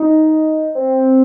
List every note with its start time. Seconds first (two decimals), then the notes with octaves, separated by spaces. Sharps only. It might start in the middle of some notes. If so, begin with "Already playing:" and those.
Already playing: D#4
0.75 C4